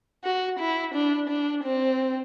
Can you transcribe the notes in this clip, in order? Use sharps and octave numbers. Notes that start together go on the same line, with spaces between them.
F#4
E4
D4
D4
C4